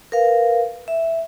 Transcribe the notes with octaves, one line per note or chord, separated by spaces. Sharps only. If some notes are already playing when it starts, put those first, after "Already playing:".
A#4 B4 F5
E5